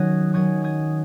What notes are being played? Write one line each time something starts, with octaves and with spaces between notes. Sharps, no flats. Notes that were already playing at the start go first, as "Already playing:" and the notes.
Already playing: D#3 F#3 C#4 D#6 F#6 G#6 A#6
D#3 F#3 C#4 D#6 G#6
D#6 G#6